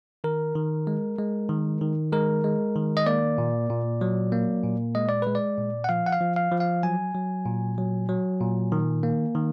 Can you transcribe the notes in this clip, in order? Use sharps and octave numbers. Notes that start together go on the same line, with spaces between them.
D#3 A#4
D#3
G#3
G#3
D#3
D#3
G#3 A#4
G#3
D#3
D#5
A#3 D5
A#2
A#2
F#3
A#3
A#2
G#3 D#5
D5
G#3 B4
D5
A#2
F#5
F3 F5
F#5
F5
F3
F5
F3
F5
F#3 G#5
F#3
A#2
F#3
F#3
A#2
D#3
A#3
D#3